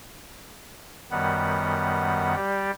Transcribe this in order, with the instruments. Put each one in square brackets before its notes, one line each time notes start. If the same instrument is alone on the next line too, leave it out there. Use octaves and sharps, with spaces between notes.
[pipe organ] F#2 D#3 G3 B3 F#5
G3 G4 D5